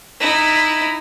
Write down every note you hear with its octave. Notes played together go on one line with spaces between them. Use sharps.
D#4 E4